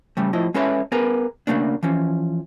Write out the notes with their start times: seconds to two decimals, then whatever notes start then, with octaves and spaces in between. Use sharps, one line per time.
0.17 C#3 G3 A3
0.33 A2 F3 E4 D#5
0.54 G#3 C#4 A4 B4 C#5 E5
0.92 B3 G#4 A#4 B4
1.47 C#3 E3 A3 A#3 D4
1.83 E3 F3 C#4